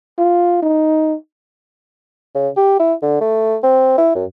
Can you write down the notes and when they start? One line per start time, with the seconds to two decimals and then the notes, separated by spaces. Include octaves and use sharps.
0.18 F4
0.62 D#4
2.35 C#3
2.57 G4
2.80 E4
3.02 D3
3.21 A3
3.63 C4
3.98 E4
4.15 F#2